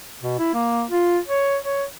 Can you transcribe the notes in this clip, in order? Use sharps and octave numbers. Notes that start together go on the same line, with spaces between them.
B2
E4
A#3
F4
C#5
C#5